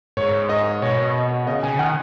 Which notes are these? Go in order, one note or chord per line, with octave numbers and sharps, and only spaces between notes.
G#2 C#5
D#5
B2 C#5
D#5
C#3 D#5
C#3 G#5
D#3 F#5